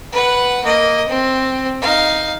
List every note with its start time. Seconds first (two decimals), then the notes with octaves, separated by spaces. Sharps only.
0.12 B4 F#5
0.64 A#3 D#5
1.08 C4
1.82 D#4 F5